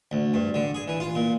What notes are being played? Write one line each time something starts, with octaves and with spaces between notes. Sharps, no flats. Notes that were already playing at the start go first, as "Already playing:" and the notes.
D2
G2
D3
G#4
E3
F4
A#2